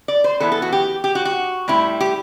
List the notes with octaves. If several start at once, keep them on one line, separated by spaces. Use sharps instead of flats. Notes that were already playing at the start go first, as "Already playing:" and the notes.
D5
C5
E3 B3 E4 A4
A4
F#4
G4
G4
F#4
F#4
A2 G3 C4 E4
G4